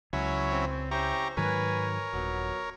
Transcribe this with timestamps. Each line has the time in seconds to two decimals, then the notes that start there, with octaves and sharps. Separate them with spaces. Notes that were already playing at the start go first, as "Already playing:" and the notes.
0.13 C#2 F#3 C#4 E4
0.51 C4
0.91 C#4 E4 G4 C5 A#5 C#6
1.37 G#2 D#3 F#3 A#4 B4 C#5 G#5
2.13 D#1 F#3 B3